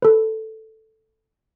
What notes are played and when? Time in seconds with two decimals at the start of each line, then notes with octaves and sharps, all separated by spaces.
0.02 A4 B4